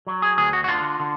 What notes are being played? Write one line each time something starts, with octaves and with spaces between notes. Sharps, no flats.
F#3
G#4
D2 G#4
F#4
F#4
D3 F4
D3